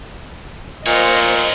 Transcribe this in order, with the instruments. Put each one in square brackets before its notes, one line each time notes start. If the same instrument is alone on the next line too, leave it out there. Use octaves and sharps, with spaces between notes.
[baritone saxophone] A#2 [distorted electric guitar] D#4 C#5 [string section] C5 D#5